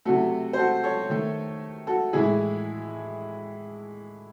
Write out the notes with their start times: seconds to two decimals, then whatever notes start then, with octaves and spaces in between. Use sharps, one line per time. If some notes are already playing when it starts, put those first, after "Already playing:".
0.05 C3 F#3 A3 F#4 A4
0.53 C5
0.57 F#4 A4
0.83 A4 C#5
1.10 D#3 A3
1.87 F#4 A4
2.13 A2 E3 G#3 E4 G#4